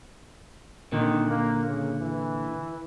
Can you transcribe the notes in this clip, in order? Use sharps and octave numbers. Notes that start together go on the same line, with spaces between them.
A#2 D3 D#3
A#3
C#3
E3